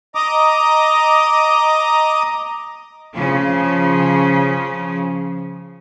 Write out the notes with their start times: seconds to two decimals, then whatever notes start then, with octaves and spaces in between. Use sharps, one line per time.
0.15 D#5 A#5 D6 D#6
3.12 C#3 F3 C#4